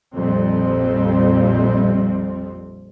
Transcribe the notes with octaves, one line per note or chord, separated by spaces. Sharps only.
A#1 F2 A#2 F3 G3 C4